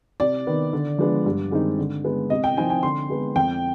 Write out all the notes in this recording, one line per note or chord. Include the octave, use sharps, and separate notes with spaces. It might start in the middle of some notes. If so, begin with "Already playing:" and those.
C3 D5
D#3 B3
D3
F3 G#3 B3 D4
G2
D#3 G#3 C4 D#4
D3
G#3 B3
C3 D#5
G5
F3 C4 D#4 G#5
G#5
D3 C6
G#3 B3
F2 G5